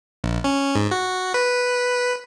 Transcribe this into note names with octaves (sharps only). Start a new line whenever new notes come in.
A#1
C#4
G#2
F#4
B4